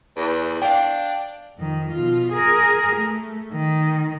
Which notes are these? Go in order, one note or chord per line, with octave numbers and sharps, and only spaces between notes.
E2
D4 F5 G5
F2 D#3
B2 F4
G#4 A#4
A3
D#3